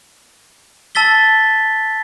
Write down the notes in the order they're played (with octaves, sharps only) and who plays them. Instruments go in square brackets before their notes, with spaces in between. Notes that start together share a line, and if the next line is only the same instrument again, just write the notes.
[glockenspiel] A5 E6 A6 B6 G7